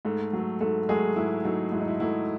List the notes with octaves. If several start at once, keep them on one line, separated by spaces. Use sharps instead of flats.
G#2 A3 A4
F#3 A3
G#2 A3 A4
F#3 G#3 A3 G#4
G#2 E4
F#3 A3 D#4
G#2 E4
D#4
E4
F#3 A3 E4